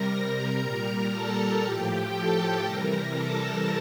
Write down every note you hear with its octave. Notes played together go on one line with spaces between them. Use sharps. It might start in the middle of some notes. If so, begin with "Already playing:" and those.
Already playing: C3 G3 A#4 A#5
A#2 G3
A4 A5
A2 F3 G4 G5
A4 A5
C3 E3 G3 A#4 A#5
A4 A5